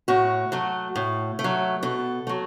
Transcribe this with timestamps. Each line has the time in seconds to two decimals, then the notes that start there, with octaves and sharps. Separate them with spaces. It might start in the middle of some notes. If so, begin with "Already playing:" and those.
0.08 A2 F#4
0.52 F#3 A3
0.96 A2
1.39 A3
1.44 F#3
1.83 B2 A4
2.27 F#3 A3